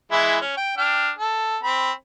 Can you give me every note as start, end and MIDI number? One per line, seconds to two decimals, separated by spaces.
0.12 0.37 52
0.12 0.37 56
0.12 0.37 64
0.41 0.53 61
0.57 0.77 79
0.78 1.11 62
0.78 1.11 79
0.78 1.11 89
1.19 1.57 69
1.63 1.92 60
1.63 1.92 83